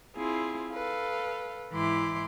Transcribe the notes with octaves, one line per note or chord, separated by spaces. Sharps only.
C4 E4 F4 G#4
A4 B4 F5
G#2 E3 E4 C6 D6